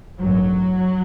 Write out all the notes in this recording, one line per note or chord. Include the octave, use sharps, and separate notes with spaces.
A1 G2 F#3